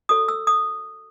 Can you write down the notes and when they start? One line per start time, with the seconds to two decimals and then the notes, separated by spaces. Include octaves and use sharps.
0.09 F#4 A4 C#5 D#6
0.28 E6
0.47 D#6